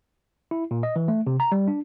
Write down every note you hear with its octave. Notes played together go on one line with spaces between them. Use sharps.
E4
A#2
D#5
E3
A3
C3
A#5
G3
D4